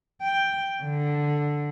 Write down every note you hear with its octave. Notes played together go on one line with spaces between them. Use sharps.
G5
D3